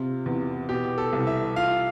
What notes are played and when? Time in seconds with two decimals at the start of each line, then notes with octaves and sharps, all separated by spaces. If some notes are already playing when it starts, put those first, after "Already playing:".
Already playing: C3 F4
0.26 E2
0.69 B2 G4
0.98 A4
1.13 C2
1.27 E5
1.56 F4 F5